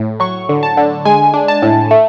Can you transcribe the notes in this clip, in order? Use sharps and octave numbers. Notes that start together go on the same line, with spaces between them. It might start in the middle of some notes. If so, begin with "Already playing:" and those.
Already playing: A2
F#3 C#6
D3
A5
D3
G#3 G#5
D4
A5
A2
A3